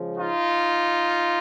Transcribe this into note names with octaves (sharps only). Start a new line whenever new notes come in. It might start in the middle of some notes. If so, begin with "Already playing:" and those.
Already playing: C#3 F3 G#3
D#4 F4